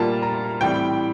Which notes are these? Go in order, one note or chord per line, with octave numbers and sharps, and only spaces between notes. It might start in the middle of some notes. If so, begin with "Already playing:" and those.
Already playing: A#2 G3 A#3 F4 A5
A#5
A2 E3 G3 C4 G5